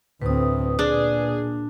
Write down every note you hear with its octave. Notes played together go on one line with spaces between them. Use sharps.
D2 A2 C4 B4 D#6
A#2 D4 G#4